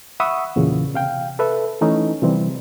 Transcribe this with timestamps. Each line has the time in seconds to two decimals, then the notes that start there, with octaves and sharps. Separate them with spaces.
0.20 E5 F#5 B5 C#6 D#6 E6
0.56 E2 A#2 C#3 E3
0.94 C3 F5 G5
1.39 A4 B4 E5
1.81 E3 A3 C#4 D#4 E4
2.22 C3 E3 G3 C4